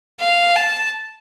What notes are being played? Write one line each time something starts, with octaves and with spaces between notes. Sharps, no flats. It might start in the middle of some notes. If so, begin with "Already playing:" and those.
F5
A5